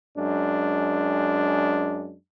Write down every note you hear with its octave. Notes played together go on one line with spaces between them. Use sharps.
F#2 G#3 D4